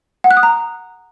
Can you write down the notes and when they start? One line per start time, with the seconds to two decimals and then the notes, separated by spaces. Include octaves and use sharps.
0.24 F#5
0.31 F#6
0.37 D#6
0.43 A#5